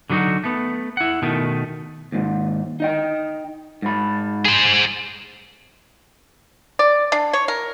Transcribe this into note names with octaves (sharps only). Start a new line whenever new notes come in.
D3 F#3 A3 D#4 F#4
A3 B3
E4 F#5
B2 D#3 A3
D#2 G#2
D#4 D#5 G5
G#2 B5
G#4 C5
D5
D4
C#5
A#4